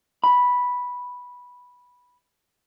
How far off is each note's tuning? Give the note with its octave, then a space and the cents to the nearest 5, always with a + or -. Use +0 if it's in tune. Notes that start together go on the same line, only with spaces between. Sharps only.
B5 -5